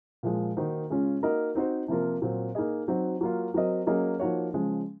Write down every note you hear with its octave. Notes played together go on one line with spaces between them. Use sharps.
A#2 F3 G#3
D#3 A#3 D#4 F#4 C5
C#3 G#3 C#4 F4
A#3 D#4 F#4 A#4 D#5
C4 D#4 F#4 C5
C3 F3 A#3 F4 A#4
A#2 F#3 C4
A#3 D#4 G#4 D#5
F#3 C4 D#4 F#4
F#3 A#3 F4
F#3 C4 F#4 A#4 D#5
F#3 A#3 C#4 G#4 D#5
F3 A#3 D#4 F#4 C#5
C#3 F3 G#3